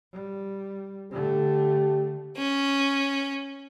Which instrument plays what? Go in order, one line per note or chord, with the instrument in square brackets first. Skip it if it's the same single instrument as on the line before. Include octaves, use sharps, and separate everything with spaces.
[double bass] G3
[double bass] D3 A3 [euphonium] G4
[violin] C#4